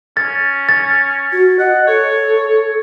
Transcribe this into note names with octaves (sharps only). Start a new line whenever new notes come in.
C#4 A6
A6
F#4
D#5 F#5
A4 C#5